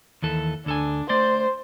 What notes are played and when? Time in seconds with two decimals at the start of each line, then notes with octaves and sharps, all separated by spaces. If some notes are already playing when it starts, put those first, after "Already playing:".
0.22 D#2 E3 A4
0.66 D2 D4 A4 G#5
1.09 A3 C5 D5 C6